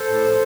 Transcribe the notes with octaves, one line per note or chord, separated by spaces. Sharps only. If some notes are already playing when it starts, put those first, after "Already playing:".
Already playing: A4 C5
A2
F3